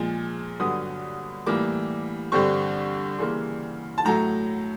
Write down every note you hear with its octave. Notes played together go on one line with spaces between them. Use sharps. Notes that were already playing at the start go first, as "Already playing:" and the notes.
Already playing: A#2 F3 G#3
G2 D3 F#3 B3 D#6
A2 E3 G3 A#3 D6
G2 D3 G3 C4 C#6
C#3 E3 G3 A#3 C6
A5
A2 F#3 A3 A#5